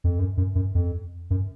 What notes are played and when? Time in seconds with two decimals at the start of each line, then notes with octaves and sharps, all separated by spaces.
0.04 F2
0.19 F#2
0.37 F#2
0.55 F#2
0.75 F2
1.30 F#2